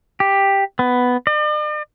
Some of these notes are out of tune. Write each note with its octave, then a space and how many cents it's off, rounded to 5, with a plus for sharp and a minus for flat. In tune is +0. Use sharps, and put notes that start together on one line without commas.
G4 +5
B3 +5
D5 +45